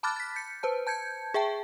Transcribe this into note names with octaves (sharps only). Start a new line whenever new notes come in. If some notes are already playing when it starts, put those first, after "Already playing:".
A5 B5 D6 F6 F#6 A6
A6 B6
G6 C#7
B4 C5 A5
A5 G6 G#6 C#7
G#4 E5 G5 A5